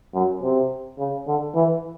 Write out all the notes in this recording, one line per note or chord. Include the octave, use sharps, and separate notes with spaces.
F#2
C3
C#3
D3
E3